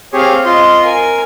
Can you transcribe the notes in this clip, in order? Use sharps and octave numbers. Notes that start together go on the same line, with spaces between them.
C4 G4 G#4 C#5 F5
F4 D#5 C6
A#4 G#5